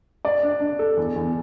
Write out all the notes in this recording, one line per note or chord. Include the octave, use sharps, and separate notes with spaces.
D5
D4
D4
A4
E2
E2